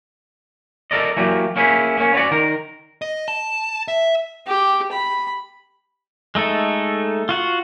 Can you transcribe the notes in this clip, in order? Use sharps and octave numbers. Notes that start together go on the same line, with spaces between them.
A4 A#4 D5 D#5
E3 F#3 A#3 G4
A#3 C#4 E4 G#4
A#3 C#4
B3 C#4 D4 F#4 D5
D#3 A#4
D#5
A5
E5
G4
B5
G#3 A3 D#4 A4
F4 F#4 F#5